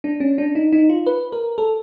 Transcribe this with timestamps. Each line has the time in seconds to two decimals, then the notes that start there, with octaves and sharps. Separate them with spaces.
0.04 D4
0.20 C#4
0.38 D4
0.55 D#4
0.73 D#4
0.89 F4
1.06 B4
1.32 A#4
1.58 A4